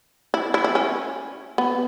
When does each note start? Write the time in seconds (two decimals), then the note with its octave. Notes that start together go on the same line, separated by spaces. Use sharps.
0.34 E4
0.54 E4
0.64 E4
0.75 C#4
1.58 B3